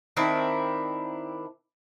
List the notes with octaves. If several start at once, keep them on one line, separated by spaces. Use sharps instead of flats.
D#3 C4 D4 E4